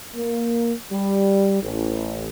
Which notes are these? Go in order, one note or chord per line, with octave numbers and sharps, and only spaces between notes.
A#3
G3
A1